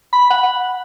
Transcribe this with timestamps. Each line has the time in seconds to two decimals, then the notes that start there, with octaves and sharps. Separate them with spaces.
0.13 B5
0.30 F#5